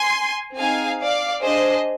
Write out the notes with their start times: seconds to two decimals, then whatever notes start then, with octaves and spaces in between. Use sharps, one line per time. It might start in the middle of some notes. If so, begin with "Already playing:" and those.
Already playing: G#5 C6
0.56 C4 D#4 G#4 F5 G#5
1.00 D5 F5
1.42 D4 G#4 C5 D#5